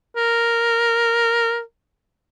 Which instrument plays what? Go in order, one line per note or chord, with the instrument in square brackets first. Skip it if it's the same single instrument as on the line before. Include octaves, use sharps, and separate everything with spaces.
[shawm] A#4